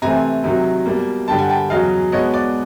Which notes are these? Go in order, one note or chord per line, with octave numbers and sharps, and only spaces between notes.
C3 E3 A3 C4 G#5 A#5
C3 D#3 F#3
B2 G3 A#3
G2 D3 G3 G5 A5
F#5 G#5
G5 A5
E2 C#3 F#3 D#5 F5
B2 G#3 B3 C#5 D#5
D5